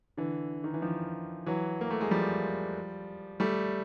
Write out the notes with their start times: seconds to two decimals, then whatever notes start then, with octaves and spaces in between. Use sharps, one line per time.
0.17 D3 E3
0.64 D#3
0.74 E3
0.82 D#3 F3
1.46 E3 F#3
1.81 A#3
1.91 A3
2.01 G#3
2.11 F3 G3
3.40 G3 A3